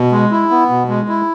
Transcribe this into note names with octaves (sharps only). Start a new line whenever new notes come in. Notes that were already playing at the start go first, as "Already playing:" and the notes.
Already playing: B2
G#3
E4
B3
B2
G#3
E4